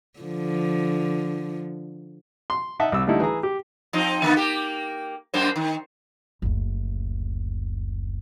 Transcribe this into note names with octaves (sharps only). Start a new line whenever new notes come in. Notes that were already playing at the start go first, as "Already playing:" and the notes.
D3 F3
C6
D#4 D#5 E5 F#5 A5
C2 E6
D3 G3 A3 D#4 E4
E3 G#4 A#5
G4
F3 C4 D#4
D3 A#3 B3
A#3 G4
F#2 A#3 C5
D#3
F#1 D2